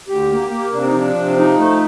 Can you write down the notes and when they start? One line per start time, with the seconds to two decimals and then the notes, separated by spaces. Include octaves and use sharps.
0.08 D2 G4
0.30 A#3
0.51 A#3
0.72 C3 D4
0.84 D#4
0.94 F3 D4
1.15 C3
1.36 F3 D#4
1.58 A3